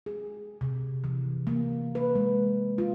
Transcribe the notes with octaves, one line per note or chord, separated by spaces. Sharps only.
G#4
C3
E3
A#3
B4
G#3
F4